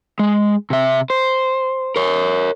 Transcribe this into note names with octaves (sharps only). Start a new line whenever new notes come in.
G#3
C3 E5
C5
A#4 C#5